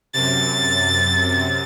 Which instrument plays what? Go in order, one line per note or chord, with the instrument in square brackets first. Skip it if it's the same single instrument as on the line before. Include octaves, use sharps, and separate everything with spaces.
[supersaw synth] F#2 C3 [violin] A6